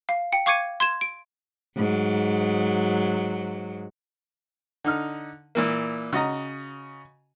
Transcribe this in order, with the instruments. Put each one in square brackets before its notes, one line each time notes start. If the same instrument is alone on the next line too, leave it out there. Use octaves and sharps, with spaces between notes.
[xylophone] F5
G5 C#7
F5 C#6 D6 G#6 C#7 D#7
C6 G#6 E7
D7
[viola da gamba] G#2 F#3
[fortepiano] D3 D#4 F6
A#2 E3 A#3
C#3 F#4 D#5 A#5